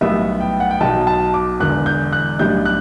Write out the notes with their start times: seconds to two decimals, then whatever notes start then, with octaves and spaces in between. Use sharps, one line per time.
0.01 B1 A2 G3 B3 E5
0.41 G5
0.60 F#5
0.71 G5
0.81 B1 B2 F#3 A5
1.07 A5
1.34 D6
1.60 E1 E2 D3 F#6
1.86 G6
2.13 F#6
2.39 B1 A2 G3 D4 G6
2.65 F#6